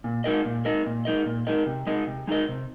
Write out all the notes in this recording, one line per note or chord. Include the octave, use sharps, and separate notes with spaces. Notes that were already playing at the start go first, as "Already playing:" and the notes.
A#2
G#3 D#4 A#4 D#5
A#2
G#3 D#4 A#4 D#5
A#2
G#3 D#4 A#4 D#5
A#2
G#3 D#4 A#4 D#5
C3
G#3 D#4 A#4 D#5
C3
G#3 D#4 A#4 D#5
C3